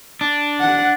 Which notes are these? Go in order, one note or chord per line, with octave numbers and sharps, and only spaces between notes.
D4
F#5